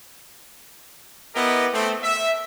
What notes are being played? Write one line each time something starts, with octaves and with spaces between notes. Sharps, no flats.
B3 E4 G4 A#4 D#5
A3 C4
E5